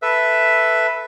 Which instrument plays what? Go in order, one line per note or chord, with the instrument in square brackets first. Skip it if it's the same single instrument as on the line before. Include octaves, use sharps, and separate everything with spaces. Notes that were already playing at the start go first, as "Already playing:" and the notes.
[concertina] A4 B4 E5